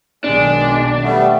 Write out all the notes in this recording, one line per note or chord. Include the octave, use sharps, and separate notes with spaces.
B1 D#3 G#3 A#3 D4
G3 A3 B3